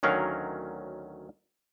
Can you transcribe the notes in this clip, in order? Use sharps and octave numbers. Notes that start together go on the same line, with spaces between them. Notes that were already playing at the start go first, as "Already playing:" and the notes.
D2 D#3 F#3 C#4 A#4 F5